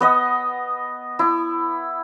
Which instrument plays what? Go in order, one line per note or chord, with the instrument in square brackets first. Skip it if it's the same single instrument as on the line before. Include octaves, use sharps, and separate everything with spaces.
[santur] B3 D#5 F#5
E4